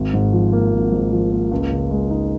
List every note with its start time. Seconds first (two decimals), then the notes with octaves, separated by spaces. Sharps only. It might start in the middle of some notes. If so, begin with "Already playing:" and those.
Already playing: G#1
0.14 G#2
0.33 F3
0.53 A#3
0.72 G#1
0.92 G#2
1.12 F3
1.31 A#3
1.51 C#2
1.71 C#3
1.91 G#3
2.10 D#4